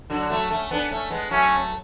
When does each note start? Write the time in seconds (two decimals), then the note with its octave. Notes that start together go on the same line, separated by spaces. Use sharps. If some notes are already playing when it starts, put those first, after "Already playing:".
0.10 D3 F#3
0.30 F#3 A3
0.50 A3 C#4
0.71 B3 D4
0.91 A3 C#4
1.10 G#3 B3
1.31 F#3 A3 C#4